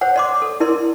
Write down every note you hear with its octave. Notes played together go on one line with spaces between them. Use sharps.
C5 C#5 F#5
D5 C6 D6
A4
E4 A#4 D5 C6